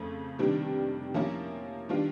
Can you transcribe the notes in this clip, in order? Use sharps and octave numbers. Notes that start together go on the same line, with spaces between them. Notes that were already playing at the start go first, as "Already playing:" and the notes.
Already playing: F2 C#3 F3 A3
C3 D#3 G3 B3 D4
F3 A#3 C#4 E4
D#3 G3 B3 D4 F4